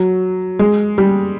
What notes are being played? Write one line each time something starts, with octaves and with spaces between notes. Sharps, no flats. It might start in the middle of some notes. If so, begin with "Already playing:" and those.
Already playing: F#3
G#3
G3